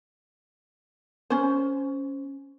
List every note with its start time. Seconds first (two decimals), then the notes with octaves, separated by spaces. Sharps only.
1.30 C#4 C5